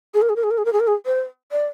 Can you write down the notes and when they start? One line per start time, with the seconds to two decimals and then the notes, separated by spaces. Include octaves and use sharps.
0.14 G#4
0.22 A#4
0.29 G#4
0.36 A#4
0.43 G#4
0.51 A#4
0.58 G#4
0.65 A#4
0.73 G#4
0.80 A#4
0.87 G#4
1.06 C5
1.52 D5